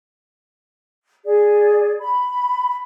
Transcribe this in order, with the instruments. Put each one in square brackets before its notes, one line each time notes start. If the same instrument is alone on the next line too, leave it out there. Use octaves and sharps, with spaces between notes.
[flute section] G#4 D5
B5